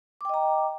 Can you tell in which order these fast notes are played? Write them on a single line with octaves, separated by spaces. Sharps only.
D6 G5 D#5 A#5